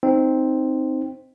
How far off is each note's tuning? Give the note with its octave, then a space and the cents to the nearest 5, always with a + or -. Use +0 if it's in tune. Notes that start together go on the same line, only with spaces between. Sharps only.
C4 +0 D#4 +0